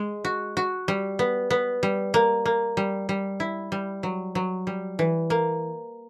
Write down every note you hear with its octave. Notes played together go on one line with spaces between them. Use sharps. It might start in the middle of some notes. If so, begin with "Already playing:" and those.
Already playing: G#3
F#4
F#4
G3
B3
B3
G3
A#3
A#3
G3
G3
E4
G3
F#3
F#3
G3
E3
A#3